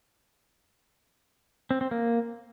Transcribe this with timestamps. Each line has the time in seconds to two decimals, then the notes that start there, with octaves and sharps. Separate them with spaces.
1.71 C4
1.81 C4
1.91 A#3